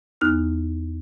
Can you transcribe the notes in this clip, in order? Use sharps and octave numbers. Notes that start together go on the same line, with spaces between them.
E2 B3 D#4 F6 F#6